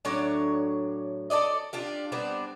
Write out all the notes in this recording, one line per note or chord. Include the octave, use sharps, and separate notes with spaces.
A2 F#3 D4 C#5
A4 B4 D5 D#5
D4 F4 G4
G3 B3 C4 D4